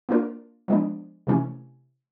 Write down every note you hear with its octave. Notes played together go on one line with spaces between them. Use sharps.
A#3 D4 F4 A#4
F3 G#3 B3 D4
C3 E3 A3 C#4